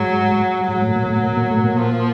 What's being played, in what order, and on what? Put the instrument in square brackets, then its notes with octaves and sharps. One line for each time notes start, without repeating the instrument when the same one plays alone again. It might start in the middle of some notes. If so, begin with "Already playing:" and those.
Already playing: [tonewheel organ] G#2 G#3 [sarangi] F#3
[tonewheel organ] G3
[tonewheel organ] G#2 G#3 [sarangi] F#3
[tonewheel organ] A2 A3
A#2 A#3
A2 A3
A#2 A#3
A#2 A#3
A2 A3
A#2 A#3
[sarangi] F3